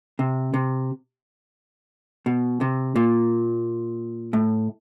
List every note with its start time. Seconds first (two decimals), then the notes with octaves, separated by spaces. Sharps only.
0.19 C3
0.54 C3
2.26 B2
2.61 C3
2.96 A#2
4.33 A2